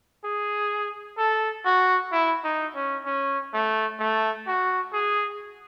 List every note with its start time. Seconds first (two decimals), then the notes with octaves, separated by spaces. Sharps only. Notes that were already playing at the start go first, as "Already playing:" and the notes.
0.24 G#4
1.18 A4
1.65 F#4
2.12 E4
2.44 D#4
2.75 C#4
3.06 C#4
3.53 A3
3.99 A3
4.47 F#4
4.93 G#4